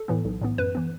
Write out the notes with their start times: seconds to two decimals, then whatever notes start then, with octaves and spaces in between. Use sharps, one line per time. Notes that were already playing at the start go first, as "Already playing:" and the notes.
Already playing: A4
0.08 A2 E3 B3
0.25 B1
0.42 A2 E3 B3
0.58 F#2 B4
0.75 E3 B3